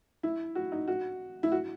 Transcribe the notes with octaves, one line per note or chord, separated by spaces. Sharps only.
E4
F#4
D#4
F#4
E4
F#4